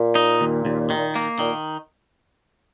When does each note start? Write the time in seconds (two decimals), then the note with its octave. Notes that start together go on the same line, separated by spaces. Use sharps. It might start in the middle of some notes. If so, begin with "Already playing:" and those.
Already playing: A#2
0.15 D#4
0.41 D#2
0.65 D#2
0.90 D#3
1.15 A#3
1.39 A#2 D#3